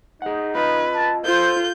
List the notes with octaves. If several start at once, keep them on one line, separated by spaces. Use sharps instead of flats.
D#4 G#4 F#5
F4 B4 D#5 F5
A5
F4 A4 C5 G6